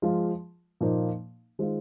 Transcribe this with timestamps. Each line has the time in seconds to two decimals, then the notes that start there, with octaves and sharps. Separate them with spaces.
0.02 F3 G#3 F4
0.81 A#2 F3 A#3 D#4 C5
1.59 D#3 G#3 F4 C5